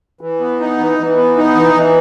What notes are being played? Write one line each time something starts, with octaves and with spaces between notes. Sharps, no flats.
E3
B3
D#4
E3
E3
B3
D#4
E3
E3